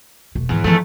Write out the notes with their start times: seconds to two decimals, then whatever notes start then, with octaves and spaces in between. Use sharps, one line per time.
0.35 E1 A3
0.49 E2 G#2 D#3
0.64 E2 F3 A3